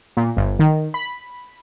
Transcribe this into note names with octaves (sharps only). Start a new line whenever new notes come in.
A#2
G1
D#3
B5